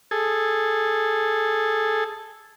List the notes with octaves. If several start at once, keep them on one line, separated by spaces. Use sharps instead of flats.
G#4 A4